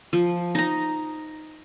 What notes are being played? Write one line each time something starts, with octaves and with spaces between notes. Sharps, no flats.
F3
D#4 A#5